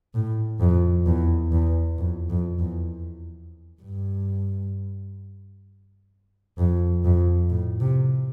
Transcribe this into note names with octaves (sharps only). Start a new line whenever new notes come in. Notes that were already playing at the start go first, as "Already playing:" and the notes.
A2
F2
E2
E2
F2
F2
E2
G2
F2
F2
A2
C3